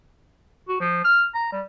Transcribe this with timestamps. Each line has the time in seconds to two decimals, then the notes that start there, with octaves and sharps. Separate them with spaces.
0.69 F#4
0.80 F3
1.04 F6
1.34 A#5
1.52 G3